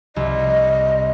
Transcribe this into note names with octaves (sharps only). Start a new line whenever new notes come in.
C2 D#5